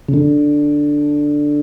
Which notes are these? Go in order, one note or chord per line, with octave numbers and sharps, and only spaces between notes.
C#3
D3